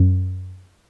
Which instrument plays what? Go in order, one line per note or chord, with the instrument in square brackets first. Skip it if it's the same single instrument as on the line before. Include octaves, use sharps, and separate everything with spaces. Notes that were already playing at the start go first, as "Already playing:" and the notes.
Already playing: [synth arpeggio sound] F#2